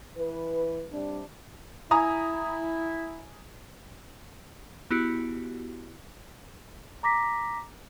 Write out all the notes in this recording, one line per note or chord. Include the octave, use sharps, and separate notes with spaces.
E3 B4
C3 G3 D4
E4 G#5 A#5 D#6
B3 E4 F#4 G4
A#5 D6 A#6 B6